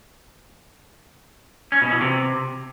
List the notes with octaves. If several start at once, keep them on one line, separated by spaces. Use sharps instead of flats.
C#4
B2
E3
C3